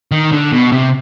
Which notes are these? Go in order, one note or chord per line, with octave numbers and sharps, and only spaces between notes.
D#3
D3
B2
C3